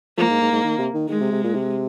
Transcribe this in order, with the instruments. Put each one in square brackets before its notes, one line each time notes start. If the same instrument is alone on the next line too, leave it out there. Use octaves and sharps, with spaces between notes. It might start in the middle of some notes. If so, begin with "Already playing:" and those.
[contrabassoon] F3 [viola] A#3
[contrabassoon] G#2
G#2
G#2
D#3
C3
D#3
[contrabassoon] D#3 [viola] G#3
[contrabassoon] C3
C3
A#2
C3